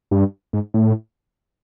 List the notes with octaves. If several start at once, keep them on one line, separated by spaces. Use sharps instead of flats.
G2
G#2
A2